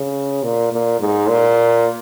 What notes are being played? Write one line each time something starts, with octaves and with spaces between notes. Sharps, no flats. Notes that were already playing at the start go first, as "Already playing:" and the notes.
Already playing: C#3
A#2
A#2
G#2
A#2